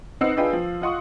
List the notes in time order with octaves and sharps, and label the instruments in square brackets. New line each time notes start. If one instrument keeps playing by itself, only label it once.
[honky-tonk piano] C4 D#4 B4 F#5 E6 C7
D4 F4 G#4 B4 D#5 G5
F3
F4 D#5 F#5 C6 C#6 D#6